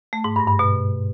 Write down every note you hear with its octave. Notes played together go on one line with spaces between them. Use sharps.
A3
G#2
G2
G2
B2